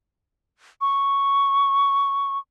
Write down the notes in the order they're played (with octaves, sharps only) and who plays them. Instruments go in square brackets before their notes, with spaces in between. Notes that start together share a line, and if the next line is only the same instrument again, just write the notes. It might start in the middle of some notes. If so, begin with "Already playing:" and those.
[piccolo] C#6